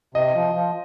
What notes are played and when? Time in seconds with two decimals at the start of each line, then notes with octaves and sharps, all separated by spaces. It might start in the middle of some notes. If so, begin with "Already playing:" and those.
0.15 C3 D#5
0.35 F3
0.55 F3